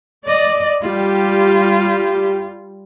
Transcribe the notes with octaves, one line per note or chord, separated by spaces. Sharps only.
D5 D#5
G3 F4 G4